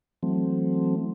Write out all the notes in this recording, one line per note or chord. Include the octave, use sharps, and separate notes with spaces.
E3 F#3 A3 C4